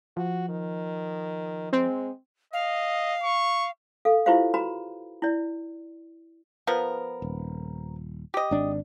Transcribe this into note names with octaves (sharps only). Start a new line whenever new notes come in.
F3 F#4
D#3
G#3 C4
D#5 F5
C#6
A4 F5
E4 F4 G4 B4 C5 F5
F#4 B4 A#5 B5
E4 D5
F3 B3 A#4
D#1
G4 D#5
G#1 D4